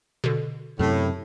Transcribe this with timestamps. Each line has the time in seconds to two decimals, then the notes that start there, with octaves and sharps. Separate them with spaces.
0.24 B2 D3
0.79 F#2 A2 C3